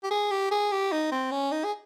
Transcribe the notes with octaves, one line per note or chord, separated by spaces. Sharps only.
G4
G#4
G4
G#4
G4
D#4
C4
C#4
D#4
G#4